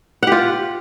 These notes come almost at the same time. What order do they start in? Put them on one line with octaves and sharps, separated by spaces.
F#5 G4 F4